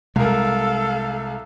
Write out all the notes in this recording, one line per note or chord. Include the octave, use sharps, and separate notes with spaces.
C2 G#3 A4 A#4 F5